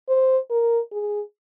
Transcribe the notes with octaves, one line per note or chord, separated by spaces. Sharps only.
C5
A#4
G#4